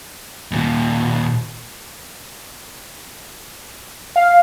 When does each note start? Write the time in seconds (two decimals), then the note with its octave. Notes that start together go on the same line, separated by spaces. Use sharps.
0.52 D#2 A#2
4.16 F5